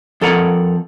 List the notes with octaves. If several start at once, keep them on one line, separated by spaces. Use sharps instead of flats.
F2 A4 A#4 F#5